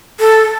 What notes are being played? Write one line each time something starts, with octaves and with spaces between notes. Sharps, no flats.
A4